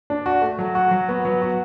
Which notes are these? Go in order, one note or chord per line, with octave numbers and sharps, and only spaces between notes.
D4
F#4
A3
F#3
F#4
F#3
B3
F#3
F#4